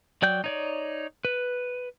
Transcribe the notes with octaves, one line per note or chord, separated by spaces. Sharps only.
F#3 D5 G5 G6
D#4 C#5 D5
B4